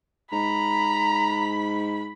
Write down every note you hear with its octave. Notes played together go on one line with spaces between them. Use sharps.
G#2 A#5 B5